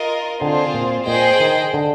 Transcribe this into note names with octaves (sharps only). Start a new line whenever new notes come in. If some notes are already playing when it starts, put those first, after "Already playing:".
Already playing: F4 A#4 D#5
D3 C4 F4 G#4 C5
A#2
A#2 G#4 C5 D#5 G5
D#3
D3